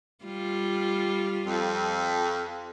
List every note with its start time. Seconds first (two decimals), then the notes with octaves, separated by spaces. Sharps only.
0.24 G3 F4
1.45 F2